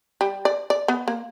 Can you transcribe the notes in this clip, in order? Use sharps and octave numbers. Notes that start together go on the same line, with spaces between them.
G3
D5
D5
B3
A#3